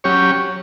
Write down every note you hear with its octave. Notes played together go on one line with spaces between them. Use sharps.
F#3 C#4 G4 C#5